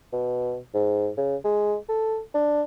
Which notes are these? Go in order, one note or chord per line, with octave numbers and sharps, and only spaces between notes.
B2
G#2
C#3
G#3
A4
D4